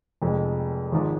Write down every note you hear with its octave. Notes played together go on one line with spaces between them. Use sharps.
F1 F2 C3 G#3
G#1 G#2 F3 G#3